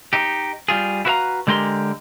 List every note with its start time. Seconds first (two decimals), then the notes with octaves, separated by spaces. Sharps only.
0.13 D#4 G4
0.68 G3 F4 G#4
1.05 E4 F#4 B4 D5 F5 A#5
1.47 D3 G#3 G4 A#4 C6